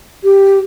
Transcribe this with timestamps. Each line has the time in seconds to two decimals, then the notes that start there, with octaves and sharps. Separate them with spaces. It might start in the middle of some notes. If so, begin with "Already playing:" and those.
0.24 G4